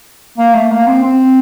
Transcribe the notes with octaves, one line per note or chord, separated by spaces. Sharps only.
A#3
A3
A#3
C4
C4